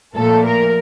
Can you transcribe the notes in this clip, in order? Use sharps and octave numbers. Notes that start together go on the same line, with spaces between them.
A#2 F3 A3 A4
A#4